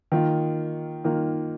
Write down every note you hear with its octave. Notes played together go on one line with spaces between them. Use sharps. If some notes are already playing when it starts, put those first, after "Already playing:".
D#3 A#3 F4
D#3 A#3 F4